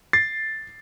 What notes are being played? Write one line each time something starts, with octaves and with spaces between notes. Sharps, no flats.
A6 C7